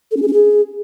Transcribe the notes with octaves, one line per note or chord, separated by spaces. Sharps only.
A4
C#4
G#4
C#4
G#4